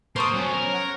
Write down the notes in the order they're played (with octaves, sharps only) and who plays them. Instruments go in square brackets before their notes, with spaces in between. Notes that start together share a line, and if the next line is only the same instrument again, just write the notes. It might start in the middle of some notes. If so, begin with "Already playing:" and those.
[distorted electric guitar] A#3 [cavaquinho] C5 C#6 D#6 [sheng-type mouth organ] A5
[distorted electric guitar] F#3 B3 [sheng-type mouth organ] C#4
[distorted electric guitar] A#4
[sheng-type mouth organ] C#5 F#5 F6